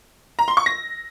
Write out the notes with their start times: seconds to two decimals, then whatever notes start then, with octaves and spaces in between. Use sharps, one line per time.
0.39 A#5
0.48 C6
0.57 C#6
0.66 A#6